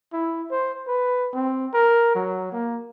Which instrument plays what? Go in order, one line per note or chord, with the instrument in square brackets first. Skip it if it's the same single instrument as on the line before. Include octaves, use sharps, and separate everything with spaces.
[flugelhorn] E4
C5
B4
C4
A#4
F#3
A#3